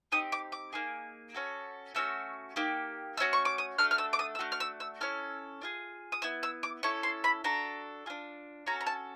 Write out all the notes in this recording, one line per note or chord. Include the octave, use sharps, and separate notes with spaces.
C4 D#4 G4 D#6
D6
D6
A#3 D#4 G#4
C#4 F#4 A4
A3 C#4 F#4 E6
A#3 D#4 G4
A3 C#4 F#4 E6
C#6
D6
D#6
A3 D4 F#4 A4 F6
F6
E6
D6
D#6
E6
A3 D4 F#4 F6
F6
E6
E6
C#4 E4 A4 F6
D4 F4 G#4
D#6
B3 E4 E6
E6
D6
C#4 E4 A4 C#6
C6
B5
D4 F#4 A4 A#5
D4 F4 G#4
C#4 F#4 A4 A#5
A#5
A5